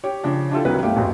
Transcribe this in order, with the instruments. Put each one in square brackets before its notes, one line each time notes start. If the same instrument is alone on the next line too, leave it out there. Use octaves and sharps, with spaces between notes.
[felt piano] G4 C#5
C#3 F3 D4
D4 E4 F4 G4 A4
C2 D#3 F#3 E4 B4
G1 A3 G4 F5
D#1 A1 F#2